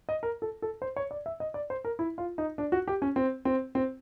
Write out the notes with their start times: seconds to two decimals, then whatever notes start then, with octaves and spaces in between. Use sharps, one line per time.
0.09 D#5
0.23 A#4
0.42 A4
0.62 A4
0.82 C5
0.96 C#5
1.11 D5
1.26 E5
1.40 D#5
1.54 D5
1.70 C5
1.85 A#4
1.99 E4
2.18 F4
2.38 D#4
2.58 D4
2.72 F#4
2.88 G4
3.02 C#4
3.16 C4
3.45 C4
3.75 C4